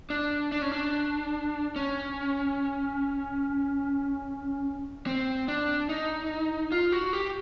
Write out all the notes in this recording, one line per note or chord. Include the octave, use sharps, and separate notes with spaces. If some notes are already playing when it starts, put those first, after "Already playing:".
D4
D4
C#4
D4
C#4
C4
D4
D#4
F4
F#4
G4